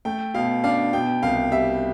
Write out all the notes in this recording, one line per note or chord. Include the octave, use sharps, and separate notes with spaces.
A3 G5
B2 F5
D4 F5
B2 G5
C2 F5
G3 E5